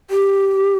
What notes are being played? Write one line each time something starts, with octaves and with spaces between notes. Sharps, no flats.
G4